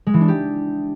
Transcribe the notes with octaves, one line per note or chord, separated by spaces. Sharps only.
G#3
E3
D4
G4